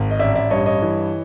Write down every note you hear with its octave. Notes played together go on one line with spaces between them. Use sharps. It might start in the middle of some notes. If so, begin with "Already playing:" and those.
Already playing: G#1
D#5
A1 D5 E5
D5 E5
G2 C#5 D#5
C#5 D#5
E3